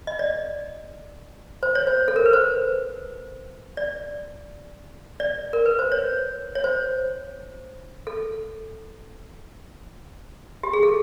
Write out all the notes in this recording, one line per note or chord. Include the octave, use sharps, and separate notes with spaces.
D#5
D5
C5
C#5
C5
A4
A#4
B4
C5
D5
D5
A#4
B4
C5
C#5
C#5
C5
A4
G4
G#4
A4